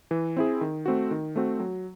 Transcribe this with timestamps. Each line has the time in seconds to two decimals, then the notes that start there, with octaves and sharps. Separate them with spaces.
0.11 E3
0.37 C4 E4 G#4
0.61 D#3
0.86 A3 C4 F#4
1.11 D#3
1.36 A3 C4 F#4
1.60 F#3